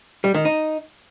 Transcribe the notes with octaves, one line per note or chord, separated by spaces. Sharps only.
G3
D#3
D#4